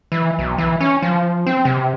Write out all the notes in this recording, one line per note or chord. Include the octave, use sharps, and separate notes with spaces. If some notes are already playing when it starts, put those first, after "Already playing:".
E3
B1
E3
C#4
F3
C4
C3